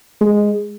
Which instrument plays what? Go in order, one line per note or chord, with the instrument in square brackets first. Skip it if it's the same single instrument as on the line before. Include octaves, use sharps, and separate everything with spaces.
[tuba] G#3